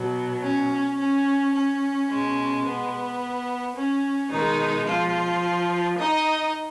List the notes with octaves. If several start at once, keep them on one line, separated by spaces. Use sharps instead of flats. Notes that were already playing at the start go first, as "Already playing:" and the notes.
Already playing: B2 F#3
C#4
C#4
C#4
B2 G#3
B3
C#4
B2 D#3 G#3 D#4
F3 F4
D#4 D#5